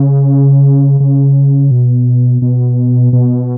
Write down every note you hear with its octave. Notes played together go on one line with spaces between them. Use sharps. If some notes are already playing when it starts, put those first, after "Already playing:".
Already playing: C#3
C#3
B2
B2
B2